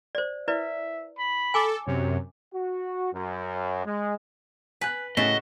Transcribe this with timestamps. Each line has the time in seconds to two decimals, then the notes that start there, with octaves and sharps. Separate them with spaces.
0.15 C5 D5
0.48 E4 B4 D5 E5
1.18 B5
1.54 A4 G#5 D6
1.87 F#2 C3 C#5
2.54 F#4
3.13 F#2
3.85 G#3
4.81 B4 G#5 F#6
5.17 A2 C#3 F#4 D#5 E5 A6